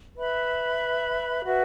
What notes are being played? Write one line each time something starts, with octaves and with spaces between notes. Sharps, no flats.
B4 E5 B5
F#4 B4 E5